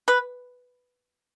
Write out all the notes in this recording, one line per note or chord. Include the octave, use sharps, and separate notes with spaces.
B4